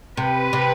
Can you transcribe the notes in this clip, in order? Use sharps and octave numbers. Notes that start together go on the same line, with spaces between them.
C3 B4
C3